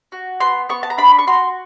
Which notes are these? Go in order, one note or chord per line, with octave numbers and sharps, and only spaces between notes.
F#4
B3 C6
B3 C#6
A5
A#5
D4 B5
C#6
F#4 C6